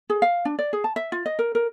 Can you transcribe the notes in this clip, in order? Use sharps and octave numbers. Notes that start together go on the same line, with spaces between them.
G#4
F5
D4
D5
G#4
A5
E5
F4
D#5
A#4
A#4